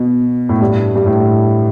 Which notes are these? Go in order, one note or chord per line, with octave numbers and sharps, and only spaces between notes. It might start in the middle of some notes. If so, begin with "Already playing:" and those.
Already playing: B2
A2
G2
G2
A2